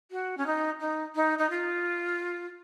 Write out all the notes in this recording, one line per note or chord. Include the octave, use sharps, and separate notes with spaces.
F#4
C#4
D#4
D#4
D#4
D#4
F4